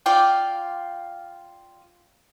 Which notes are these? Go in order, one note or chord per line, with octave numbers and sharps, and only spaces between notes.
F4 D5 G5